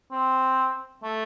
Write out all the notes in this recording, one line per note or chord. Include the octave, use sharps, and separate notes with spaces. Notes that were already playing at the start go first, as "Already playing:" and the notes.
C4
A3